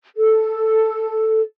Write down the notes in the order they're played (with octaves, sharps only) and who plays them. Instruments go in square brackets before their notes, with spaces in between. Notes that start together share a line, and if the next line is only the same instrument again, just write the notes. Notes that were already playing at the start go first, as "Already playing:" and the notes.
[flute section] A4